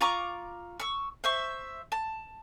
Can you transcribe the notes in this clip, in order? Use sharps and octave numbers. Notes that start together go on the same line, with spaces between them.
F4 A#5 C#6 D6
C#6 E6
C5 E5 C#6
A5